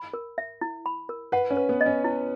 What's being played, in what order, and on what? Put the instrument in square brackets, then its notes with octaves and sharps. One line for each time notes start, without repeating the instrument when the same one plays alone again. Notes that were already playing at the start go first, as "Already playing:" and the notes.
Already playing: [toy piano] B5
A#4
E5
E4
B5
A#4
[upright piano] B4 [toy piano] F#5
[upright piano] C#4
[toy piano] B4
[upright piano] B3
[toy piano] D#5
[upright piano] C#4
[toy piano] E4